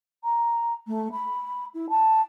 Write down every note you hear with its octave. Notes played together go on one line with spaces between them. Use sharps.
A#5
A3
B5
E4
A5